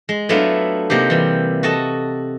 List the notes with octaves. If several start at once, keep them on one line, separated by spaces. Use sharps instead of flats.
G#3
F#3 A3 B3 D4 E4 F4
C3 A#3 D#4 G4
E3 G3
F#4 A4 D#5 A5